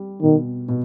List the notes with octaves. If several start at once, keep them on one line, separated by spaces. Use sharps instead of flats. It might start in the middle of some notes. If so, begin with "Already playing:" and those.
Already playing: G3
B2 D#3
B2